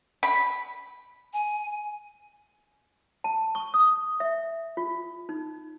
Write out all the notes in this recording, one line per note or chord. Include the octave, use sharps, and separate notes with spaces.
B5
G#5
A5
C#6
D#6
E5
F4
D#4